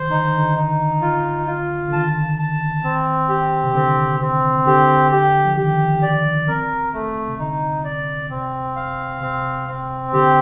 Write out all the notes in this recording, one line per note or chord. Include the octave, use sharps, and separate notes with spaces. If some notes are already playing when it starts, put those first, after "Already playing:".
Already playing: D#3 C5
D3 D#4
D#3
D3
D#4
F4
F4
D3
D#3 A5
A5
C4
G4
C3
D3 C4
C4
D3 G4
G4
F3
D#3 G4
D5
C4 A#4
A3
C3
D3 D#4
D5
C3 C4
F5
C3 C4
C4
D3 G4